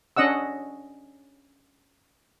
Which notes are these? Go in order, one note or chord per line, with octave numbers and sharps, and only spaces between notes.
C#4 D4 D#5 F#5 E6